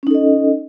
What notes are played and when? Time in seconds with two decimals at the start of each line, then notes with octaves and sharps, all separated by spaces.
0.03 C#4
0.07 D#4
0.11 A4
0.15 D#5